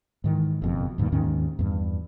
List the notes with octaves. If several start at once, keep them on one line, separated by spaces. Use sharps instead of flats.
G#2 D#3 E3
F#1 F2 B2
D2 G2 A#2 D#3
D#2 G#2 D#3 C#4
E2 G2